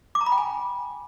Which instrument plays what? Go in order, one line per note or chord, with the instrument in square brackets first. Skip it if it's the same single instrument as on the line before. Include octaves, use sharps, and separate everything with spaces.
[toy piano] D6
A#5
B5
G5
G#5